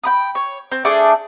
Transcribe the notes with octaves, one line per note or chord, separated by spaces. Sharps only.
G5 B5 D#6
C#5
C4
A3 D4 G#4 D5